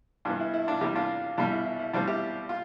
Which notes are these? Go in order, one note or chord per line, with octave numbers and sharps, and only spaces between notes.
G2 E3 B3 D4 F4
E4
E4
D4 F4
E2 C3 E3 G3 E4 G4
D4 F4
E2 B2 G3 D4 F4
E4
E4
E4
E2 B2 G3 C4 D4 F4
E4 G4
F4